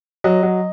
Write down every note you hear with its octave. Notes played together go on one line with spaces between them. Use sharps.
F#3 D#5
F#3